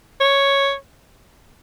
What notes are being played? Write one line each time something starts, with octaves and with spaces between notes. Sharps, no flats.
C#5